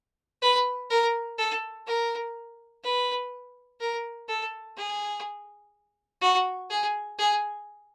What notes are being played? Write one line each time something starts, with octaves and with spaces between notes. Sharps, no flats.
B4
A#4
A4
A#4
B4
A#4
A4
G#4
F#4
G#4
G#4